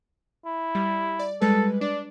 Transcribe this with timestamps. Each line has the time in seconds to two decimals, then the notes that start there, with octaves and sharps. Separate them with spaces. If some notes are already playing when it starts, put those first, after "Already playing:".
0.45 E4
0.75 G3
1.19 D5
1.41 G3 G#3 A4 B4
1.81 D4 D5